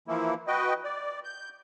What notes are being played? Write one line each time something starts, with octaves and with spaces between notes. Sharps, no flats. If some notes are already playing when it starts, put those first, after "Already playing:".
E3 F3 A#3 E4
F#4 B4 D#5 G5
D5
G6